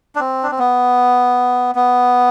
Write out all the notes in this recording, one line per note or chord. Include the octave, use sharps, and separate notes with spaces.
D4
C4
D4
C4
B3
B3